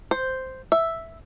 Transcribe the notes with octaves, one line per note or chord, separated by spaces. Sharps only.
C5
E5